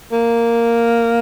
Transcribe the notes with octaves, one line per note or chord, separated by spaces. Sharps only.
A#3